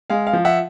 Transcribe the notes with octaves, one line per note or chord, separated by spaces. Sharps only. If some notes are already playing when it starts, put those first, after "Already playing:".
G#3 F5
F5
F3
E5 F#5